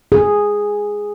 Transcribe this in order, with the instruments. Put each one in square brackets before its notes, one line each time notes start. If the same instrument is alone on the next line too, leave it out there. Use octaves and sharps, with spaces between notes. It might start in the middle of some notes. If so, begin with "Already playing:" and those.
[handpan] G#4